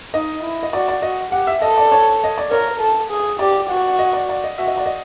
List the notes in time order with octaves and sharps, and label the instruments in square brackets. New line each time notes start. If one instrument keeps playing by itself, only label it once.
[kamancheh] D#4 [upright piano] D#5
[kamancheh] E4
[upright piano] D#5
[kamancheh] F#4 [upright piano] D5
[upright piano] D5
[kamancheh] F#4 [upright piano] D#5
[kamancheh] G4 [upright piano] F#5
[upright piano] E5
[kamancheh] A4 [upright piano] D#5
[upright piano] D5
C#5
D#5
D5
[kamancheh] A#4 [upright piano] C#5
[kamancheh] A4
G#4
[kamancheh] G4 [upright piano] D5
[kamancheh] F#4
[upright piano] D#5
D5
D5
D#5
[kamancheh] F#4 [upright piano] E5
[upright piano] D#5
D5
D#5